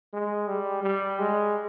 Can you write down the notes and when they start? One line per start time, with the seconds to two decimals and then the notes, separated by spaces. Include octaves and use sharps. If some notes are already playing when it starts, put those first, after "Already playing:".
0.13 G#3
0.47 G3
0.83 G3
1.19 G#3